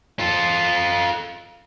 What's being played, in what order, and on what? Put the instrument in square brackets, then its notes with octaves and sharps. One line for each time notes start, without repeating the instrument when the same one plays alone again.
[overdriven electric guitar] F4 A4